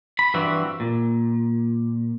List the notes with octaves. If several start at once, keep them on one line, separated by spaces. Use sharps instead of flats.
B5
G2 E3 C4 F#4
A#2